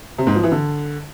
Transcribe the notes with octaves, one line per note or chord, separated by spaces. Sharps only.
C3
G#2
F3
E3
D3